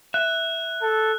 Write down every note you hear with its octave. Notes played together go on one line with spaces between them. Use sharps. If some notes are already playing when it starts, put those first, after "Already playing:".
E5 F#6
A4